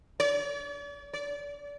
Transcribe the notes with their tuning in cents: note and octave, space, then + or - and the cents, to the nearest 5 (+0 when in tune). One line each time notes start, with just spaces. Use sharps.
D5 -45
D5 -30